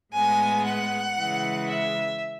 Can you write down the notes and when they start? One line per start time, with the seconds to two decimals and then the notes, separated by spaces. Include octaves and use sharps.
0.14 A2 G#3 B3 G#5
0.66 F#5
1.16 C#3 E3 G#3
1.68 E5